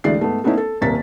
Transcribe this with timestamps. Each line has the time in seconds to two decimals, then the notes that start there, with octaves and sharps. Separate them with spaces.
0.04 D2 E3 G#3 D5 C7
0.19 G#2 A3 B3
0.44 A3 B3 C#4 D#4 E4
0.57 A4
0.81 D#1 C2 A#3 A6 B6